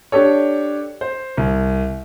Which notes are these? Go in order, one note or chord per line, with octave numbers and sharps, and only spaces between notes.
D4 G4 A4 C#5
C5
C2